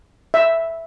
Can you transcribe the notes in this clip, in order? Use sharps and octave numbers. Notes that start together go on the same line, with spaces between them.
E5